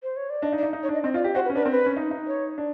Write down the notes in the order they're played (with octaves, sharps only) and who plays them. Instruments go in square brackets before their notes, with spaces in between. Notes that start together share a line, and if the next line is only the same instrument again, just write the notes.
[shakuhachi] C5
C#5
D5
[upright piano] D4 [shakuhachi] D#5
[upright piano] D#4
[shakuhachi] D5
[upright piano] D#4
D#4
[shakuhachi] C#5
[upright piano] D4
[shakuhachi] D#5
[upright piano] C4 [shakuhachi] D#5
[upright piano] F4 [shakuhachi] D#5
[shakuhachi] D5
[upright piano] G4
[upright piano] F#4 [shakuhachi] C5
[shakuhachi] B4
[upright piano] C#4
[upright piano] D4 [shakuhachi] B4
[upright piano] C4 [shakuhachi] A#4
[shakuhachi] B4
[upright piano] C#4
D#4
D#4
[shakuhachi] C#5
[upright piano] D4